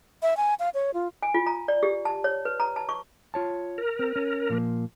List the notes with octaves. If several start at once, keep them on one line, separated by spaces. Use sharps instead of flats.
E5
G#5
F5
C#5
F4
G#5
F4
A#5
D5
G4
A5
C#5
B4
A#5
A5
C#6
F4 C#5 A5
A#4
C4
C#4
A#2 F3 A#3